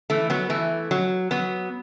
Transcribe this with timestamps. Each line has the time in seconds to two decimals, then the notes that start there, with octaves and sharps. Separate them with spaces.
0.10 E3 A3
0.30 F#3 B3
0.50 E3 A3
0.91 F#3
1.31 F#3 B3